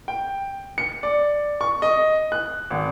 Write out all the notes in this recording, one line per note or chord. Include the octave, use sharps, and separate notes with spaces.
G5
C#7
D5
C#6
D#5
F#6
G#1